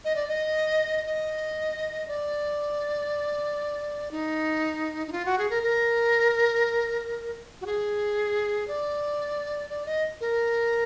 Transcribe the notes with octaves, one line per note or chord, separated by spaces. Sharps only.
D#5
D5
D#5
D#5
D5
D#4
D#4
F4
F#4
G#4
A#4
A#4
F#4
G#4
D5
D5
D#5
A#4